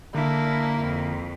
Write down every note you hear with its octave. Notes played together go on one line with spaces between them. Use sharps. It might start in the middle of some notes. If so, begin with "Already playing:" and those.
D3 A#3 D4 E4
F2